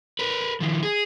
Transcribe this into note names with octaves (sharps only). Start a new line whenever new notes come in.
A#4 B4
D#3 F3
G#4